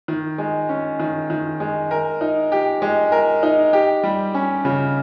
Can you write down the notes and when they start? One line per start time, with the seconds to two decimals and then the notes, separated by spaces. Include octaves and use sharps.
0.08 D#3
0.38 G#3
0.69 C#4
1.00 D#3
1.30 D#3
1.60 G#3
1.91 A#4
2.21 D#4
2.52 G4
2.82 G#3
3.12 A#4
3.43 D#4
3.73 G4
4.03 G3
4.34 C#4
4.65 C#3